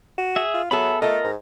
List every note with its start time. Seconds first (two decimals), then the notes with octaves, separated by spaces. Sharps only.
0.18 F#4
0.36 G#4 E5
0.54 F4
0.71 F#3 B3 G#4 A4 E5 B5
1.02 A3 F4 A4 A#4 D#5
1.24 G#2